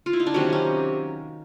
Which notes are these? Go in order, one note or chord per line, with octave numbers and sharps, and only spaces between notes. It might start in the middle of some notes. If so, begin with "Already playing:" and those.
F4
E4
D#4
D4
C3 D#3 F#3 A#3 C#4
C#4